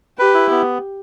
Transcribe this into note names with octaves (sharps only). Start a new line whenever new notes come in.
G4 B4
E4
B3